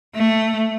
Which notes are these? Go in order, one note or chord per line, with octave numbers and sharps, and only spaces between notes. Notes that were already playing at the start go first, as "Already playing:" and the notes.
A3